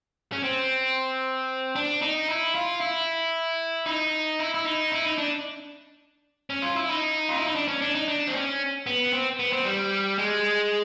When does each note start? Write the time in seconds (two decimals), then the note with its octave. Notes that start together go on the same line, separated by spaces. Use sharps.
0.32 C#4
0.43 C4
1.76 D4
2.02 D#4
2.28 E4
2.55 F4
2.81 E4
3.86 D#4
4.39 E4
4.54 E4
4.65 D#4
4.92 E4
5.05 D#4
5.18 D4
6.50 C#4
6.62 F4
6.76 E4
6.89 D#4
7.29 F4
7.38 E4
7.46 D#4
7.55 D4
7.68 C#4
7.81 D4
7.95 D#4
8.08 D4
8.27 C4
8.34 C#4
8.86 B3
9.13 C4
9.39 B3
9.53 C4
9.65 G3
10.18 G#3